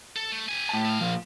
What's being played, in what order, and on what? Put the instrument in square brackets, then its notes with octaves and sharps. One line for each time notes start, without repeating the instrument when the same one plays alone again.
[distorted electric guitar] A4
A3
G4 G#5
[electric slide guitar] A2 A5
[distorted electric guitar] A3 F5
[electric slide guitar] A#2 F3